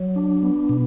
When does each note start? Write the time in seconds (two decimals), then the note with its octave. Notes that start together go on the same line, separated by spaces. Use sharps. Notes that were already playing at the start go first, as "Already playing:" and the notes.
Already playing: F#3
0.16 D4
0.43 B3
0.69 B2